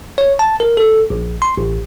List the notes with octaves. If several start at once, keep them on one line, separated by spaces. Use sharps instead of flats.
C#5
A5
A#4
A4
A#1
C6
A1